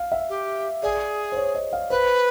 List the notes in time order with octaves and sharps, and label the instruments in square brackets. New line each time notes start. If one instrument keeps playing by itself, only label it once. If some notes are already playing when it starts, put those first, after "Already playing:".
Already playing: [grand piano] F5
E5
[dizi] G4
[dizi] G#4 [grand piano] D5
[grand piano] C5
C#5
D#5
F5
[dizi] B4 [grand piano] C5